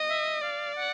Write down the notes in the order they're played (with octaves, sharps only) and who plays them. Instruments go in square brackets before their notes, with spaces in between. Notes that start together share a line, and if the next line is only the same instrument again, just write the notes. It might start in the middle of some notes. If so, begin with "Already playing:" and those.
Already playing: [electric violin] D#5
[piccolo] E5
[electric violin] D5 [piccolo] F5
[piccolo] F#5